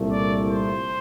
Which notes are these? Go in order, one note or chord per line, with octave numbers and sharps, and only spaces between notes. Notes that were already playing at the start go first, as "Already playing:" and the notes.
Already playing: C2 A#2 A3
D5
C5